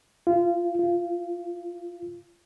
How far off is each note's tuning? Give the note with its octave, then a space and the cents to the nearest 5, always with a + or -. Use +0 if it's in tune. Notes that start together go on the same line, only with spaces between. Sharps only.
F4 -25
F4 -20